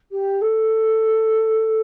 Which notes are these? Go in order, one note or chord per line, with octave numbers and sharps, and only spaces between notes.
G4
A4